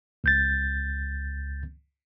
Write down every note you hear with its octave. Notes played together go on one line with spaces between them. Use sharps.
C#2 G6 A6